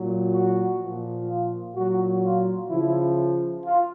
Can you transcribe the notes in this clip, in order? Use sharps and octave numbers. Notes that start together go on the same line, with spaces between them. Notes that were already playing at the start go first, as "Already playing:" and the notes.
Already playing: A#2 F#3
F#4
A#2 F3
F4
A#2 F#3 F#4
F4
C#3 F3 E4
F4